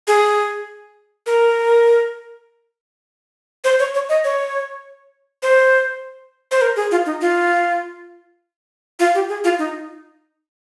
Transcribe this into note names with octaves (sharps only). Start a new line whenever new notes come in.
G#4
A#4
C5
C#5
C#5
D#5
C#5
C5
C5
A#4
G#4
F4
D#4
F4
F4
G4
G#4
F4
D#4